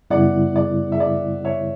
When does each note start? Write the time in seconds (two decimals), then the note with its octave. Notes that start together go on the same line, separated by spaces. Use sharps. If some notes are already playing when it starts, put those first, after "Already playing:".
0.10 F#2 C#3 G3 B3 E4 D5 F#5
0.56 D5
0.92 E5
1.00 D5
1.45 C#5 E5